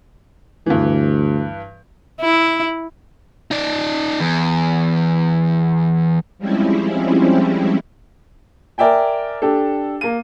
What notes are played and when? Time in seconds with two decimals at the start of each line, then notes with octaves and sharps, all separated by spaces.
0.66 D2 G2 E3
2.21 E4
3.51 D#4 D5
4.20 E2
6.38 F3 G3 G#3 C4 C#4 E4
8.78 A#4 D5 E5 G5 G#5
9.42 D4 G4 A4
10.01 A#3 D#7